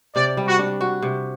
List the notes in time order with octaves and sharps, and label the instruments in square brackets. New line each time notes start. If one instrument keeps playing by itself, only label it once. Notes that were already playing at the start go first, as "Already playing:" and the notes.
[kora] C3 [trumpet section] D5
[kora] G3
[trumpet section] F#4
[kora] D4
F#4
C3